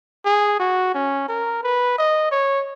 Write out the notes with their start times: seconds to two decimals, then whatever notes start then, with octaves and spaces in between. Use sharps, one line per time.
0.25 G#4
0.59 F#4
0.94 C#4
1.28 A#4
1.63 B4
1.98 D#5
2.31 C#5